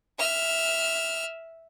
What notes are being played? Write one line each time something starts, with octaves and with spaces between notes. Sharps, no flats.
E5 F6